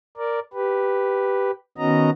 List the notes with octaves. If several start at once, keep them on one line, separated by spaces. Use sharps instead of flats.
A#4 D5
G4 B4
D#3 B3 C#4 F#4 D#5 A#5